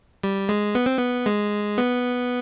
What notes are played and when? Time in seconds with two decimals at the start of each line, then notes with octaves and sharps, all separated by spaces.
0.24 G3
0.49 G#3
0.75 B3
0.86 C4
0.97 B3
1.26 G#3
1.78 B3